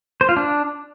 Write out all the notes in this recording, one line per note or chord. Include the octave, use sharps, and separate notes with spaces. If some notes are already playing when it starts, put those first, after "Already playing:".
C5
F4
D4